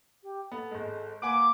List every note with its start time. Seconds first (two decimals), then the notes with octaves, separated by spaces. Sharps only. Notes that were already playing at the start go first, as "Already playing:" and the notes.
0.23 G4
0.52 B3 A4
0.71 G#1 G#3
1.22 A#3 B4 F#5 G#5 D6